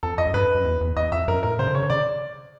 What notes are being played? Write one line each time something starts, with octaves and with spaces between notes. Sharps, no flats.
F2 A4
F2 D#5
F#2
G2 B4
F#2
E2
E2
E2 D#5
F2 E5
F#2 A#4
A2 A#4
C#3 C5
D3
C#3 C#5
D3
C#3 D5